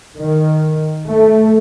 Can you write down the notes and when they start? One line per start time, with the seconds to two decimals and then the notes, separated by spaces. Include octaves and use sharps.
0.18 D#3
1.08 A3